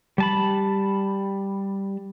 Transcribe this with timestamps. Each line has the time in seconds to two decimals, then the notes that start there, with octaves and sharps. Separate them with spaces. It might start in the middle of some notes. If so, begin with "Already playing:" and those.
0.18 G3 A5 B5